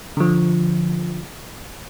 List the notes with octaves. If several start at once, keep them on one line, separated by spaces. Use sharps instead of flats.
D3 F3